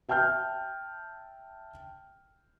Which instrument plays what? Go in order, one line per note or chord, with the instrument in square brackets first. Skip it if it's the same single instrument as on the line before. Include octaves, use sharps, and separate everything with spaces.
[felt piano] E5 G5 A5 F6 G6